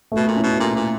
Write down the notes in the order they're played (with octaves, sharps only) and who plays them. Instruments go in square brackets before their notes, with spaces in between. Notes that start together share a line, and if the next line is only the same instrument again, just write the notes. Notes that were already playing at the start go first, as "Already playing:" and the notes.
[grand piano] A3
[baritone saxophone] B2
A#2
[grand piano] C#4 E4
[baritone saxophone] B2
[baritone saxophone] A#2 [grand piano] A3
[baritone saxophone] A#2